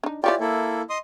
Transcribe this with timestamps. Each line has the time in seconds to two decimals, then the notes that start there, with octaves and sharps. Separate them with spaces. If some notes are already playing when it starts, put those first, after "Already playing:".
0.03 D4 D#4
0.24 E3 F4 G4 C#5 D5 G5
0.40 A#3 E4 A4
0.90 D#5 C6 D#6